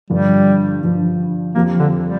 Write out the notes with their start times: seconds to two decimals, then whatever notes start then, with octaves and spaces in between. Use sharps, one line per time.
0.10 G2 D3 F3 G3
0.83 G2 D3 F3
1.55 F2 F3 A#3 C4 G4
1.79 D3
2.04 G3